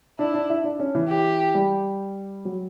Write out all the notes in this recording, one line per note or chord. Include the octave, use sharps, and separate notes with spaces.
D4 E4
D4
E4
D4
C#4
E3
G4
G3
F#3